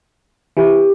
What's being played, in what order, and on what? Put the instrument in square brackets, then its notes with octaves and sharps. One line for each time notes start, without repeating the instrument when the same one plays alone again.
[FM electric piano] E3 [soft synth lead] G4